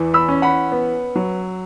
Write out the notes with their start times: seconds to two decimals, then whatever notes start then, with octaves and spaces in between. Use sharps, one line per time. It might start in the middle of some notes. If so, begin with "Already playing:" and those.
Already playing: E2 E3
0.14 B5 E6
0.29 C#4
0.42 F#5 B5
0.72 B3
1.16 F#3